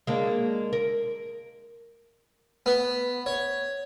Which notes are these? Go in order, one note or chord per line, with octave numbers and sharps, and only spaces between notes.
G#3 A#3 D4
A#4
B3
C#5